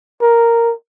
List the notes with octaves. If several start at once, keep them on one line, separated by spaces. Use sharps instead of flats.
A#4